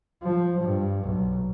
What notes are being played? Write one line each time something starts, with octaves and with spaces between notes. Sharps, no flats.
F3
G2
B1